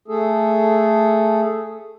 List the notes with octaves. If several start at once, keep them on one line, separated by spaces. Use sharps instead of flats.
A3 G#4 A4